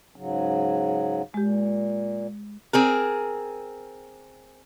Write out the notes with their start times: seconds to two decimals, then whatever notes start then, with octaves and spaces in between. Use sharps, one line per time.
0.16 G#2 C#3 F#3
1.34 A#2 G#3 G4
2.73 C4 G#4 A#4